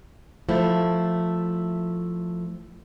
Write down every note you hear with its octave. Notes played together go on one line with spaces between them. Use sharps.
F3 A3 E4